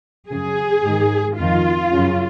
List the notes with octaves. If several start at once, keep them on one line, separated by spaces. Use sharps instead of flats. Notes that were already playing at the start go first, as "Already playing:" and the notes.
F#2 C#3 G#4
G#2 D#3
F2 D#3 F4
F#2 C#3